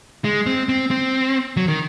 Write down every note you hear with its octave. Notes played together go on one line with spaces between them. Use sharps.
G#3
C4
C4
C4
F#3
D#3